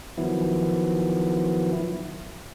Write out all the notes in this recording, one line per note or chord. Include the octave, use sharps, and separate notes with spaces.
D#3 F3 F#3 B3 E4